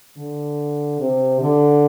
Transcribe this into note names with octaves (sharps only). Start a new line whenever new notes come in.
D3
C3
D3